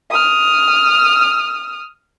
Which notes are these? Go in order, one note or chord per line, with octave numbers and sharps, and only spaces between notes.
D#6 F6